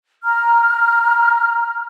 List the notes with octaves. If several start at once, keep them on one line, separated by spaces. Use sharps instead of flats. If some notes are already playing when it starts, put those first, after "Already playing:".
A#5 F6